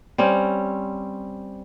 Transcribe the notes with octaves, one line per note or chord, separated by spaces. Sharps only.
G3 C4 C#4